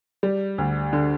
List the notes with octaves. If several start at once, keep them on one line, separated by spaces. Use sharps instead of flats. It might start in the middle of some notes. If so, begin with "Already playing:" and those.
G3
D2
D3